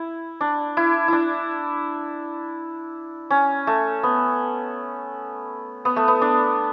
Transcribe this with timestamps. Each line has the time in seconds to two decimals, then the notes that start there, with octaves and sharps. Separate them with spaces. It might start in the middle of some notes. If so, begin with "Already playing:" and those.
Already playing: E4
0.41 D4
0.77 E4
1.08 D4 E4
3.30 C#4
3.67 A3
4.03 B3
5.85 B3
5.96 A3
6.08 B3
6.22 D4